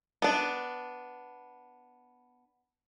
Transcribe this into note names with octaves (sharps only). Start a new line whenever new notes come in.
B3 D4